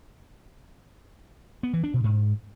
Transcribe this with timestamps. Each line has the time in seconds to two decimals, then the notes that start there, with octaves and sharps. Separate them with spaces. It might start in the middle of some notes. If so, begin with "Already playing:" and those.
1.63 B3
1.73 E3
1.84 D4
1.94 B2
2.04 G#2